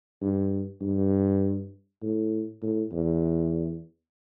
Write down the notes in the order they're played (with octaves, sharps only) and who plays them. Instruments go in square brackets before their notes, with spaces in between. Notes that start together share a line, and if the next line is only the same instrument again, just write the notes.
[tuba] G2
G2
A2
A2
E2